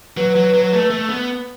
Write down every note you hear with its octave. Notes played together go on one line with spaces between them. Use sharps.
F#3 B4
F#3
F#3
A3
A3
B3